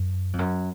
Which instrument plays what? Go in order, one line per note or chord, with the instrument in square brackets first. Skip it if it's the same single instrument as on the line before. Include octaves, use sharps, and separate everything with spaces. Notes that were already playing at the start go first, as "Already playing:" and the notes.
Already playing: [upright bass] F#2
F2
F#2